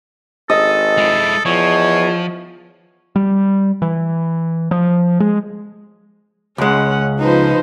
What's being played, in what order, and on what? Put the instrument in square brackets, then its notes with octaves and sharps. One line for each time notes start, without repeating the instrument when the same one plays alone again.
[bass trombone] G#1 [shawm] A4 [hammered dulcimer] D#5
[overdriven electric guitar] G#3 E4
[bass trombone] E2 [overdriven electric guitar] F3 [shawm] C#5
[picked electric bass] G3
E3
F3
G#3
[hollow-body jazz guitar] C#2 G#3 [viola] C#4 F#5
[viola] F3 C5 [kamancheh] D#4 B4